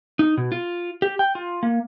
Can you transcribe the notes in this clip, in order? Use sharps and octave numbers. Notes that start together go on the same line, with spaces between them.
D#4
B2
F4
G4
G5
F4
A#3